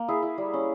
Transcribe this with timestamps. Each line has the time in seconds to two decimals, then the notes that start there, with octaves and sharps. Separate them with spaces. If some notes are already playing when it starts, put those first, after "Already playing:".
Already playing: A#3
0.08 E4 G#4
0.23 E4
0.38 G3
0.53 C#4